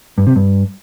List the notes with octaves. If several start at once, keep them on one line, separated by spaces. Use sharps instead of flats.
G2
C3
G2